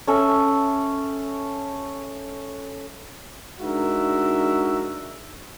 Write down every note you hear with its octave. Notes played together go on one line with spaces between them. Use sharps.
C#4 A4 E5
G#3 D4 D#4 F#4 A#4 E5